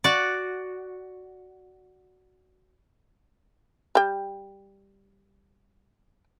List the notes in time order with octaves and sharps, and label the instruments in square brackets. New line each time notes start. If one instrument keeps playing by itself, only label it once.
[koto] F#4 D5
[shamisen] G3 G5